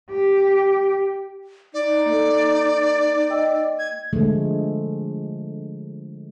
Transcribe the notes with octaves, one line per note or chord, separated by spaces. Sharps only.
G4
D#4 D5
A#3 A4
D#5 G5 E6
G#6
D3 F3 G#3 A3